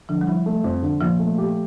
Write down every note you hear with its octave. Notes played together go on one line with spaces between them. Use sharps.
D3 F3
G3
F3 E4
A3
F2
D3
A#2 F3
A3
G4